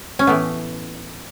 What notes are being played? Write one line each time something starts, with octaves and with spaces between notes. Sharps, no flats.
C#4
A2 E3 A3 B3